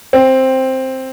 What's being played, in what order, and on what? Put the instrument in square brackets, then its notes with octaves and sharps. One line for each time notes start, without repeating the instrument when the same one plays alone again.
[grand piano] C4